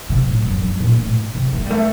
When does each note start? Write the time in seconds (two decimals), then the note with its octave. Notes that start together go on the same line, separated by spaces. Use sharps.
0.09 C3
0.27 A2
0.45 F#2
0.62 G2
0.80 A#2
0.99 A2
1.35 C3
1.53 A3
1.65 G3
1.70 A3